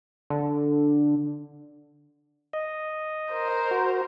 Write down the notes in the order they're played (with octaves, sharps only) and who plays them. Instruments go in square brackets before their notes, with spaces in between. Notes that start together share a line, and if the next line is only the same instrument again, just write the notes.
[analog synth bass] D3
[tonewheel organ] D#5
[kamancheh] A#4 C5
[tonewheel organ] F#4